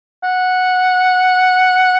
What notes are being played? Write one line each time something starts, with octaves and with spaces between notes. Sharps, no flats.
F#5